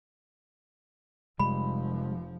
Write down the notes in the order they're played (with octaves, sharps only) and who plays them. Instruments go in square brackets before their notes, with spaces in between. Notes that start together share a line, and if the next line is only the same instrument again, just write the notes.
[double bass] F1 F3 [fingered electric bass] C3 G3 G#3 [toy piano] B5